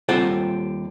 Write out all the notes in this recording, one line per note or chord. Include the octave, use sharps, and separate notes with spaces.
D#2 G3 C4 F4 A4 F#5